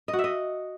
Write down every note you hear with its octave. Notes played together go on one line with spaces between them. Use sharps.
D#5
F#4
E5
D#5